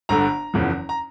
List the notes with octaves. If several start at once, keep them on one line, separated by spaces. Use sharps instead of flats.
G1 G2 D3 A#5
F#1 E2 C#3 F3
A#5